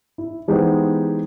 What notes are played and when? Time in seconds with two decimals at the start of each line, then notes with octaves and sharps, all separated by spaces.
0.18 E4
0.48 E3 G#3 B3 D#4 G4 C5